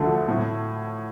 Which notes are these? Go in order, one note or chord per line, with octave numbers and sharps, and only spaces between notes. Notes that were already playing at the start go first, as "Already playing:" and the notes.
Already playing: D2 D3 F3 A3
A2